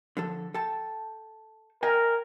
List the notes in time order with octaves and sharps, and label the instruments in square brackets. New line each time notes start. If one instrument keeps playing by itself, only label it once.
[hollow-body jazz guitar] D3 F3 A4
A4 G5 A5
[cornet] A#4 [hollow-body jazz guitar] D#5 G5 G#5